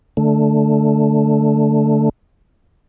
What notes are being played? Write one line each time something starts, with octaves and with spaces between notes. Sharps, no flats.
D3 A3